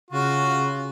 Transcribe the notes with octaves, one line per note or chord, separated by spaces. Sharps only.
C#3 F4 F#4